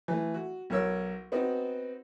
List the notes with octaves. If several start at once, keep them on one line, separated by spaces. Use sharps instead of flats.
E3 A3
F#4
B1 A#4 C#5 E6
B3 C4 D#4 F#4